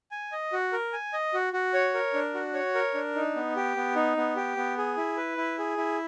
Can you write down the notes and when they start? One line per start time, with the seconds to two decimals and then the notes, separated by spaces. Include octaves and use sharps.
0.11 G#5
0.32 D#5
0.53 F#4
0.73 A#4
0.93 G#5
1.13 D#5
1.34 F#4
1.53 F#4
1.74 C#5
1.94 A#4
2.14 D4
2.34 F#4
2.54 C#5
2.75 A#4
2.94 D4
3.15 D#4
3.36 B3
3.56 G4
3.76 B3
3.95 D#4
4.17 B3
4.36 G4
4.57 B3
4.78 G#4
4.97 E4
5.17 B4
5.37 E4
5.59 G#4
5.78 E4